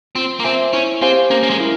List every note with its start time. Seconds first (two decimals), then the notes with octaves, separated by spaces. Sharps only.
0.15 C4 F4
0.40 A#3
0.44 C4 C5 E5 G#5
0.73 C#4 E4
1.02 C4 G4 C5 F5 G#5
1.30 A#3 C#4
1.43 A#3
1.50 G#3
1.59 E4 A#4